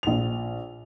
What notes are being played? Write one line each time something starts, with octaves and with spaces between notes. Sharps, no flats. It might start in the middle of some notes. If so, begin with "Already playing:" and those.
A#1 F7